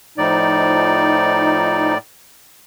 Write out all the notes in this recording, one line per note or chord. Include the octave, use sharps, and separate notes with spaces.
A2 F3 D#4 D5